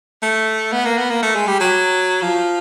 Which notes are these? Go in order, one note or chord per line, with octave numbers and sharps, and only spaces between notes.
A3
B3
A#3
B3
A#3
A3
G#3
G3
F#3
F3